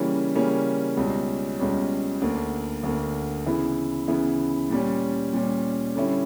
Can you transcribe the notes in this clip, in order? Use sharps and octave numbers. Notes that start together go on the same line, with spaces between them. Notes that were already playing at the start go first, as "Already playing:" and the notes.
Already playing: C#3 E3 G3 A#3 C#4
C#3 E3 G3 A#3 C#4
C#2 B2 G3 C#4
C#2 B2 G3 C#4
D2 D3 A#3
D2 D3 A#3
C#3 E3 B3 E4
C#3 E3 B3 E4
A#2 G3 C#4
A#2 G3 C#4
D3 G3 C#4 E4